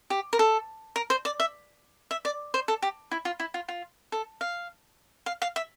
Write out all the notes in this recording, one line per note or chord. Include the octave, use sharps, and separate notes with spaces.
G4
A#4
A4
A#4
C5
D5
E5
E5
D5
C5
A4
G4
E4
F4
E4
F4
F4
A4
F5
F5
F5
E5